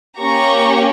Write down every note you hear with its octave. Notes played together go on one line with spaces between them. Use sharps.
A#3 C#4 G4 A#5 C#6